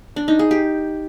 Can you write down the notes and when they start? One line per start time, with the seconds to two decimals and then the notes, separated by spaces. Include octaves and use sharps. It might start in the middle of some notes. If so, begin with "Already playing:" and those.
0.16 D4
0.28 D#4
0.39 G#4
0.51 G4